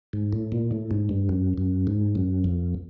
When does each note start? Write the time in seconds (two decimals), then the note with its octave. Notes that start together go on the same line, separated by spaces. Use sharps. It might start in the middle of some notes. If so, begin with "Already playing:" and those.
0.13 G#2
0.33 A2
0.52 A#2
0.71 A2
0.91 G#2
1.09 G2
1.29 F#2
1.58 F#2
1.87 G#2
2.15 F#2
2.44 F2